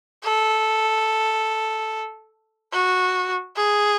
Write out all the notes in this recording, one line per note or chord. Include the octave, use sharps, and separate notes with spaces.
A4
F#4
G#4